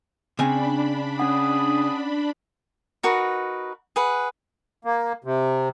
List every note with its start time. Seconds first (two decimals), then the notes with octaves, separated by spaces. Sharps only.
0.39 C#3 C4 D4 G#5 B5
1.20 C#4 G#4 F#5
3.03 D#4 F#4 A#4 B4
3.96 G#4 B4 F#5
4.85 A#3
5.24 C3